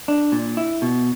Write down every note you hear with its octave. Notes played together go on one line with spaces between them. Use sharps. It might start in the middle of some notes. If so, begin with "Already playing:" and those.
D4
A#2
E4
B2